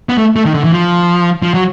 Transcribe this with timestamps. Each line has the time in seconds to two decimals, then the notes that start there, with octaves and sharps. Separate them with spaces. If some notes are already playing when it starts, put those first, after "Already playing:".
0.09 B3
0.18 A3
0.36 A3
0.45 D#3
0.55 D3
0.64 E3
0.72 F3
1.42 F3
1.54 F#3